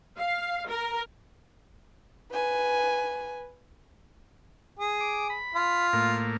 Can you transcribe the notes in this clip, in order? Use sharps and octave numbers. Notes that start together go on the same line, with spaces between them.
F5
A#4
B4 G#5
G#4
D6
B5
F4
A2 A#3